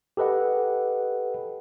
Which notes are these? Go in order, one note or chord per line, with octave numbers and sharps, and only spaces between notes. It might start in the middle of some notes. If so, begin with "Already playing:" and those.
G4 A4 B4 D#5 F#5